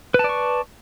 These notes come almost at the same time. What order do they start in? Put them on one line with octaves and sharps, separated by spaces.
B4 A5 D5 C#6